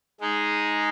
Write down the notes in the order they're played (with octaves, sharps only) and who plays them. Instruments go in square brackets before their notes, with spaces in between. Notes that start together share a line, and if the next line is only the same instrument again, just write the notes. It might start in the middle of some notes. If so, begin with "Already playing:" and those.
[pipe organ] G#3 D#4 G#4